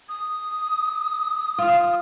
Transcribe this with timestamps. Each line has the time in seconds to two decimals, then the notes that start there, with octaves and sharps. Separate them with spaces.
0.09 D#6
1.59 F4